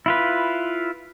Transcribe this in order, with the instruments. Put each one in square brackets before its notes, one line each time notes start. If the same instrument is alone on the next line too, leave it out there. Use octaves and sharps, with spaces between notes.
[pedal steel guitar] E4 F4 B4